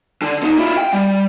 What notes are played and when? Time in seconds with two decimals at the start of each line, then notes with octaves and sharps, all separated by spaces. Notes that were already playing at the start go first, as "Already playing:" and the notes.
0.22 D3
0.43 A#3 D#4
0.58 E4 F4
0.78 G5
0.93 G3